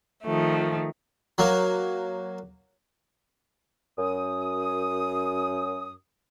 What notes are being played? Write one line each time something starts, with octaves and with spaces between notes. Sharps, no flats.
D#3 F3 A3
F#3 A#3
F#2 D#6